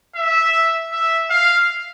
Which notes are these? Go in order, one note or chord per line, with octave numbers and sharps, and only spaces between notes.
E5
E5
F5